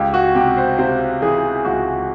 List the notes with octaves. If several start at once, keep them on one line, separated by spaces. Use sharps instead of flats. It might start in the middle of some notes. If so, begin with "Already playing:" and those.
Already playing: C#2 G4
F#4
C3 G4
C5
C3 C5
E3 G#4
C#2 F#4